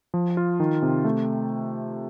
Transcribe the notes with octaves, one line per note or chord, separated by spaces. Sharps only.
F3
F4
D#3
C3
A3